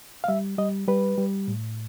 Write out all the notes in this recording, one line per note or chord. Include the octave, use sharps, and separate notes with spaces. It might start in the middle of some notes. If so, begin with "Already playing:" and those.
F5
G3 E5
G3 D#5
G3 B4
G3
A2